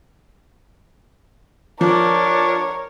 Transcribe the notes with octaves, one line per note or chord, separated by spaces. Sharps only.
F3 D4 A#4 C#5